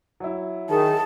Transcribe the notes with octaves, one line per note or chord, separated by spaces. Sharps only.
F#3 E4
D#3 G#4 A5